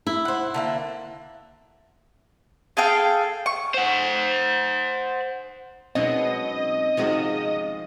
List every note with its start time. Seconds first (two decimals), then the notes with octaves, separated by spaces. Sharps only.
0.07 E4
0.25 C5 F#5
0.54 D3 A#3 E5
2.77 G#4 A4 F5 G5
3.46 C#6
3.74 C5 F#5
5.95 B2 F#3 G#3 C4 C#4 D#4 D#5
6.97 G#2 C3 D#3 F3 G#3 F#4